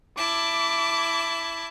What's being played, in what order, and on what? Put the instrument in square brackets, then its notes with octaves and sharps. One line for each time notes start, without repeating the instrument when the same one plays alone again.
[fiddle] E4 A5 [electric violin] D6